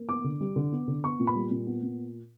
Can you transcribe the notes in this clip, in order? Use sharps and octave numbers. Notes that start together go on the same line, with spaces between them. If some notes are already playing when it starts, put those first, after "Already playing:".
Already playing: A#3
B3 D6
D3
G3
D3
B3
D3
B3 C#6
A#2
B5
G3
A#2
B3
A#2